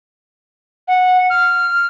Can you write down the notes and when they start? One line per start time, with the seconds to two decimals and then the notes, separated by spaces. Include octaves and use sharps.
0.88 F#5
1.30 F6